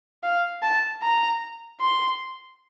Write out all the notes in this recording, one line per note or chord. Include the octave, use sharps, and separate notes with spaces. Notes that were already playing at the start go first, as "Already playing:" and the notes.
F5
A5
A#5
C6